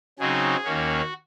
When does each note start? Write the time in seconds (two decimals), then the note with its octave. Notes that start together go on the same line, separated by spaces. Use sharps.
0.19 C#3 F#3 C4 D#4 G#4
0.64 D#2 D#3 A#3 C#4 F#4